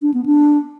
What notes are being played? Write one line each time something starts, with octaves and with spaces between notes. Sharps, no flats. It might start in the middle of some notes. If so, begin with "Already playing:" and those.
D4
B3
D4